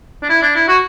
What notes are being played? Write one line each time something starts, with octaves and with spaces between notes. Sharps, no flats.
D4
E4
D4
E4
F#4